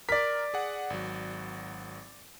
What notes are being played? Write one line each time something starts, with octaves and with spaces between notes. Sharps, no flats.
A#4 D5 B6
G#4 F#5
G#1 F#3